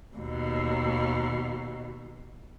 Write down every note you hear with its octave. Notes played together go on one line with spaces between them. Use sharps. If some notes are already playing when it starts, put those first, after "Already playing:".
D#2 B2